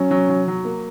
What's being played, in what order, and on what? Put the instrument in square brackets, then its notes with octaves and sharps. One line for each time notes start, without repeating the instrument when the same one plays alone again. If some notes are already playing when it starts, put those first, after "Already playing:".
Already playing: [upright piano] F#3 [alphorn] C#4
[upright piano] F#3
F#3
F#3
A#3